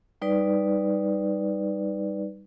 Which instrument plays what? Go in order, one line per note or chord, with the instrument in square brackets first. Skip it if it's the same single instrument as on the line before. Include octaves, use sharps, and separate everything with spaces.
[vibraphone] G3 D#4 B4 D5